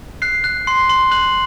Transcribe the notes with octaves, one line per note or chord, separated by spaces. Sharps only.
F#6 C7
F#6
C6 C7
C6
F#6 F#7